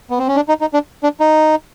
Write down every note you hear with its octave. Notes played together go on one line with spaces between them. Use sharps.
B3
C4
C#4
D4
D#4
D#4
D4
D4
D#4